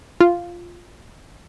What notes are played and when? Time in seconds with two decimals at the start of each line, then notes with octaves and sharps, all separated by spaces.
0.21 F4